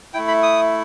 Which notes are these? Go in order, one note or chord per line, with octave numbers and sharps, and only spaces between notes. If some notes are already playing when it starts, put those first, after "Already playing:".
A3 E4 G5
B5
D#6